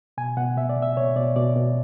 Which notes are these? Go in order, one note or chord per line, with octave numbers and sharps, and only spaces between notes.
B2 G#5
B2 F#5
B2 E5
D5
B2
E5
B2 C#5
B2 D5
B2 D5
B2